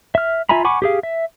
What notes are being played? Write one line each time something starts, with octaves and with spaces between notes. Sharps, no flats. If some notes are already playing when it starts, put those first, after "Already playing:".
E5 F6
F4 E5 G#5 A#5 B5
F#5 G#5 B5 C#6 D6
G4 G#4 F5
E5